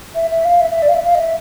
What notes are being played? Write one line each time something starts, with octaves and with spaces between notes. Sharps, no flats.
E5
E5
F5
E5
E5
D5
F5
E5
F5
D#5
E5